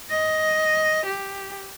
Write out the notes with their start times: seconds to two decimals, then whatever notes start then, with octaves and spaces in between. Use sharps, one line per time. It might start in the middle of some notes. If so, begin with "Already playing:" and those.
0.10 D#5
1.06 G4